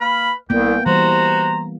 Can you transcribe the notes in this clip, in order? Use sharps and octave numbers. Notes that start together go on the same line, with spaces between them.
A#3 B4 B5 F6
C2 A#3 B3 G5
E3 G3 F#4 C5 A#5